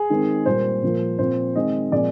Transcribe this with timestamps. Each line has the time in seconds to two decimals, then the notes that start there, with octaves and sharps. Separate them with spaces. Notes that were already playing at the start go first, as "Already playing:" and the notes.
Already playing: G#4
0.10 D#3 G#3 C4
0.46 A#2 G3 A#3 C5
0.83 A#2 F3 A#3
1.19 A#2 F3 C4 C5
1.56 D#3 G#3 C4 D#5
1.92 A#2 F3 G#3 C4 D5